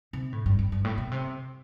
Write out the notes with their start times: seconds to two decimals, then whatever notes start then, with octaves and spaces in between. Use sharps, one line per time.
0.13 C3
0.32 A2
0.46 G2
0.59 G2
0.72 G2
0.85 A2
0.98 B2
1.11 C3